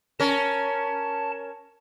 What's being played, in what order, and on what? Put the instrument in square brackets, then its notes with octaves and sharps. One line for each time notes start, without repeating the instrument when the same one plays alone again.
[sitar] C#4 A#4 [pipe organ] A5